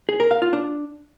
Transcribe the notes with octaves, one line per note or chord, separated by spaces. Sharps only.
G#4
A#4
F5
F4
D4